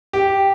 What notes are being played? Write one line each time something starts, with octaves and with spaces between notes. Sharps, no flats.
G4